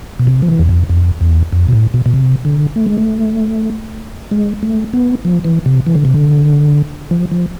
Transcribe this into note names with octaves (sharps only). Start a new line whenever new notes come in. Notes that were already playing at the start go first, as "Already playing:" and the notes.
B2
C3
F3
E3
E2
F2
F2
E2
F2
B2
A2
B2
B2
C3
D3
A3
G#3
A3
G#3
A3
B3
F3
E3
C3
E3
D3
C3
D3
F3
F3